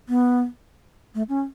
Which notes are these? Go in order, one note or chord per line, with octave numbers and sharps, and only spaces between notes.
B3
A3
C#4